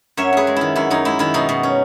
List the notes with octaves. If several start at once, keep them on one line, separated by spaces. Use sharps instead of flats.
F#2 C#5 E5
F#2 G#4 B4
G#3
D#3 E4
F#2 E4
F#2 D#4
G#3 E4
D#3 E4
B2 D#4
B2
C#4